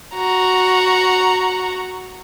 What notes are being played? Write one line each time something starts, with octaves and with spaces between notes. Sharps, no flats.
F#4 A#5